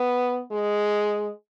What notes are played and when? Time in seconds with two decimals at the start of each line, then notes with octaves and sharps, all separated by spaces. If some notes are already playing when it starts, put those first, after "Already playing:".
Already playing: B3
0.52 G#3